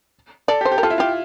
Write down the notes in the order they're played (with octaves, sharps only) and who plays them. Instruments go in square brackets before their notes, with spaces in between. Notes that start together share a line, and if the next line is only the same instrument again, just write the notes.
[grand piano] A4 [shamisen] D5
[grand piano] G4
[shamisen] C5
[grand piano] G4
[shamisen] A#4
[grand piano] F4 [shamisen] A4
[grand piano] E4
[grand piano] F4 [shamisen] G4